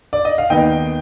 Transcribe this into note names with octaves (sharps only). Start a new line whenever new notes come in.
D5
D#5
F5
D#2 D#3 B3 D#5 G5